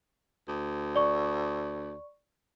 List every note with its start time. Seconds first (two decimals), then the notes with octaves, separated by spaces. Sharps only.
0.48 D2
0.96 D5 C#6